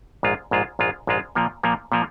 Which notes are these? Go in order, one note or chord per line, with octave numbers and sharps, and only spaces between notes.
A#1 G#2 G#3 F4
A#1 G#2 G#3 F4
A#1 G#2 G#3 F4
A#1 G#2 G#3 F4
A#2 F3 A#3
A#2 F3 A#3
A#2 F3 A#3